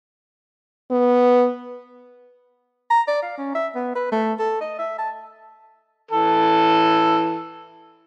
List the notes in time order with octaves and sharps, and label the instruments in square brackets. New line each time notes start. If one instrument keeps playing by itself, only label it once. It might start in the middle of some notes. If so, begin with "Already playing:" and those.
[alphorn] B3
[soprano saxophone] A#5
D5
F5
C#4
E5
B3
B4
A3
A4
D#5
E5
A5
[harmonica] E3 A4